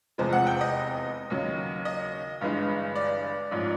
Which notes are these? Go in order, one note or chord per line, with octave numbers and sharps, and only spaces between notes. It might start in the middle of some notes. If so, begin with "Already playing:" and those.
F1 E2 C3 F3 G#3 C5
F#5
G5
D#5
D#2 C#3 F#3
D#5
G1 G2 E3 G#3
D5
A1 G#2 F3